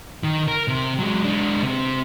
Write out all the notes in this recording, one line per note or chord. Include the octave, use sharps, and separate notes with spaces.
D#3
A#4
C3
F#3 G#3
G#3 D4
C3 C4